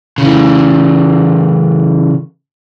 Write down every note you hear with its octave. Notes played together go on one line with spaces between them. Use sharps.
C#3 E3